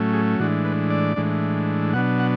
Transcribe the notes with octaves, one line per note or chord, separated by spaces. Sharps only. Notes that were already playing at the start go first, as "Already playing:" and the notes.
Already playing: A2 F#3 A3 C#4
G#4
A2 E3 G#3 D4 F#4
B4
D5
A2 E3 G#3 D4
B2 F#3 B3 D4 F#5
F#5